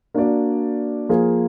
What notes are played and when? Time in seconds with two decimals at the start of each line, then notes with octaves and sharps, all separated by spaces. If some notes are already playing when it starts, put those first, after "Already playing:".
0.14 A#3 D4 F#4 D5
1.09 F3 A#3 F4 G#4